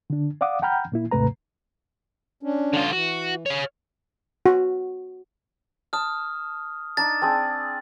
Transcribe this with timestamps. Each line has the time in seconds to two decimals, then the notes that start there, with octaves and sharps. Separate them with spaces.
0.10 D3 D4
0.41 D5 F5 F#5 D6 D#6
0.62 F#5 G5 A#5 B5 F6 G6
0.92 A#2 A#3 E4
1.11 D#2 G#2 C3 A3 B4 A#5
2.43 C#4 D4
2.74 D3 F4
2.93 E3 F#4
3.46 C#5 F5
4.46 F#4
5.93 A5 D#6 F6
6.97 D4 D#4 A5 A6
7.22 C4 D4 G#4